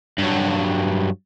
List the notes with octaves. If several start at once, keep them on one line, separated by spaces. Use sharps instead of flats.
G2 F#3